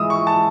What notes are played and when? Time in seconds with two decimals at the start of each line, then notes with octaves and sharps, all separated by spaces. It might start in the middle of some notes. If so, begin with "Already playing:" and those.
Already playing: G#2 E3 G#3 D#6 E6
0.10 C#6
0.27 A5